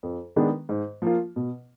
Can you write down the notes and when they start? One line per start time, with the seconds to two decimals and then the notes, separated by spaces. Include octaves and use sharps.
0.03 F2
0.36 D#3 G#3 B3 D4
0.69 G#2
1.02 F3 A#3 F4
1.36 B2